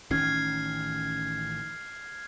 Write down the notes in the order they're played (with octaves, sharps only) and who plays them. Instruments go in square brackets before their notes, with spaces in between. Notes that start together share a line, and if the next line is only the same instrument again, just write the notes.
[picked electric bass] A1 D#3 C#4 [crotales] F6 G#6 C7